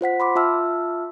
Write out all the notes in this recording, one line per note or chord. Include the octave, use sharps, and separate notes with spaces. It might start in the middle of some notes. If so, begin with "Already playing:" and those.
F4 C5 F#5 B6
B5 C6 D6
F4 E5 A5 E6 F6